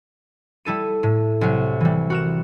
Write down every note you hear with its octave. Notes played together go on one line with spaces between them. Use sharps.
G3 E4 A4 D#7
A2
C2 F#3
E3 G3
F#4 A#4 E7